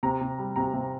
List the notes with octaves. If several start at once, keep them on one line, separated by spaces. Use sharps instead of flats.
C3 A#5
C3
G3
C3 A#5
C3